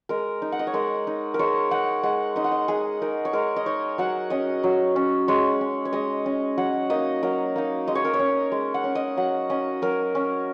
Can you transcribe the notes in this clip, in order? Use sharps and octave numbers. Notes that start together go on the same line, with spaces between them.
G#3 A#4
D#4
F#5
D#5
C#5
G#3 A#4
D#4
A#4
G#3 C#5
D#4 F#5
G#3 F#5
D#4 D#5
F#5
D#5
G#3 G#4
D#4 A#4
C#5
G#3 A#4
D#5
D#4 C#5
F#3 F#5
C#4 D#5
F#3
C#4
G#3 C#5
C#4
C#5
G#3 D#5
C#4 D#5
F#3 F#5
A#3 D#4 D#5
F#3 A#4
A#3 D#4
G#3 D#5
C#5
A#4
C#5
C#4
G#3
F#5
C#4
D#5
F#3 F#5
C#4 D#5
F#3 A#4
C#4